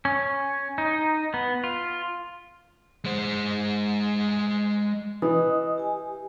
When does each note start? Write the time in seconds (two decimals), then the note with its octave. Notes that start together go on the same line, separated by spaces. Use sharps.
0.05 C#4
0.78 D#4
1.34 B3
1.64 F4
3.05 G#3 C5
5.22 E3 D#5 D#6
5.78 G4 G#5